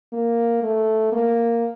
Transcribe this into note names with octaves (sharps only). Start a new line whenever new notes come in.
A#3
A3
A#3